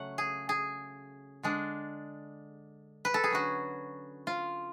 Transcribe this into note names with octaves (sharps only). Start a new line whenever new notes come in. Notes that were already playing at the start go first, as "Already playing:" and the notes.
Already playing: C#3 F#3 A3 C#4 F#5
G#4
G#4
D3 G#3 D4
B4
A4
G#4
D3 F#3 C#4 F#4
F4